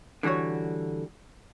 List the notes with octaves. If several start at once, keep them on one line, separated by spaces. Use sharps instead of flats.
D3 E3 G3 F#4 C#5